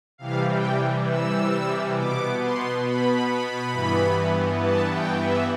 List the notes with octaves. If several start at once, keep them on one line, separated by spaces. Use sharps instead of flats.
C3 E3 G3 F5
G5
E6
B2 B3 D6
C6
B5
G2 E3 B3
A5
G5
E5